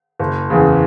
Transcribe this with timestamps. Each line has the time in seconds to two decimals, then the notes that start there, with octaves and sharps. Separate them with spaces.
0.19 F#1
0.50 E2 C#3